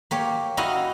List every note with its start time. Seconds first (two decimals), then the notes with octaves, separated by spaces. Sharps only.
0.11 A#3 G4 C#5
0.57 D#4 E4 F#4 D#5 F5